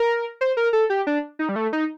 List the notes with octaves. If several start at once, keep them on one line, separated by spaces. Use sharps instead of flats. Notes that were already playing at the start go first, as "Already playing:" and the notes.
Already playing: A#4
C5
A#4
A4
G4
D4
D#4
G3
A3
D#4